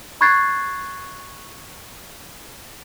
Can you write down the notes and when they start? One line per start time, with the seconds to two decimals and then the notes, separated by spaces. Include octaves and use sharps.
0.21 B5 C#6 F#6 G#6 A6 C7